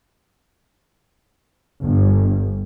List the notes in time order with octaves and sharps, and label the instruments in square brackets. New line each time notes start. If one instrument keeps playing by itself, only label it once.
[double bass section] G1